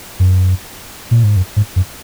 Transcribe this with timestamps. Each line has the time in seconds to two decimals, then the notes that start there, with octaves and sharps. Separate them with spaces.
0.20 F#2
1.11 A#2
1.24 G#2
1.36 F#2
1.56 G#2
1.76 F#2